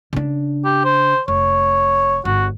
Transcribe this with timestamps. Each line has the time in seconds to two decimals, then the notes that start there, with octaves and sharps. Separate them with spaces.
0.13 C#3 D4
0.65 G4
0.85 C5
1.28 F1 C#5
2.25 G1 F#4